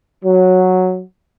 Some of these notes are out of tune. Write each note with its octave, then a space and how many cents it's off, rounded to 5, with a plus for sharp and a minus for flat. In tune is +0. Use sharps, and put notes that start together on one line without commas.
F#3 -5